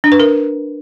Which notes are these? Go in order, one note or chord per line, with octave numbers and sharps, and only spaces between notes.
D4
B4
A#4